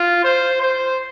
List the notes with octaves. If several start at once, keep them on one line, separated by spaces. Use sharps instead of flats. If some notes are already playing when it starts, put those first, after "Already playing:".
Already playing: F4
C5
C5